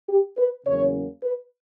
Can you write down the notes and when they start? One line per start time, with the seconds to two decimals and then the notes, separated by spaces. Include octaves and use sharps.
0.09 G4
0.38 B4
0.65 E2 C#3 F#3 A#3 C#4 C#5
1.23 B4